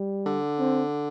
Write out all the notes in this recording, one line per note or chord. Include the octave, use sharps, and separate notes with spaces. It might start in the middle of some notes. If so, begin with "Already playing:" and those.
Already playing: G3
D3
C4